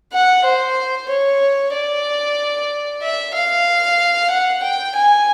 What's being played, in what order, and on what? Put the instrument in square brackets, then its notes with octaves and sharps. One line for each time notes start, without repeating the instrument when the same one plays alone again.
[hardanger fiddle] F#5
C5
C#5
D5
E5
F5
F#5
G5
G#5